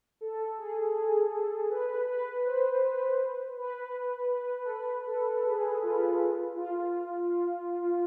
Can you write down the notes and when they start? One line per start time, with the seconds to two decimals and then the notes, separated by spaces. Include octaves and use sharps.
0.21 A4
0.59 G#4
0.96 G#4
1.34 A4
1.70 B4
2.08 B4
2.46 C5
2.83 B4
3.57 B4
4.65 A4
4.70 B4
5.07 A4
5.45 G#4
5.83 F4
6.56 F4